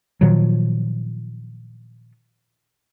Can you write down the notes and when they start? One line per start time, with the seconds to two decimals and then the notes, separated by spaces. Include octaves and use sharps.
0.21 A#2 D#3 F3 F#3